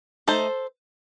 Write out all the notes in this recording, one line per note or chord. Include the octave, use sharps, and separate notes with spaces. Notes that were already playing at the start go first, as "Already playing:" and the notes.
A3 D#4 A4 C5